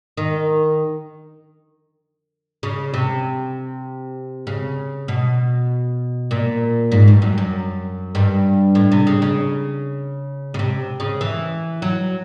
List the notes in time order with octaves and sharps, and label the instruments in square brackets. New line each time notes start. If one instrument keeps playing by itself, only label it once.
[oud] D#3
C#3
C3
C#3
B2
A#2
G#2
G2
F#2
F#2
G2
A2
C3
C#3
C#3
C#3
C3
C#3
E3
F#3